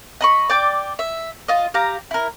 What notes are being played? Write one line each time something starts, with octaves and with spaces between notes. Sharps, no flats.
D#5 B5 C#6
D5 G5 D6
E5
F4 D#5
G4 F5 A#5
E4 A#4